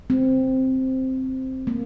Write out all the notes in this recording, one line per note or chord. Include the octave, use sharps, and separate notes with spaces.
C4
A#3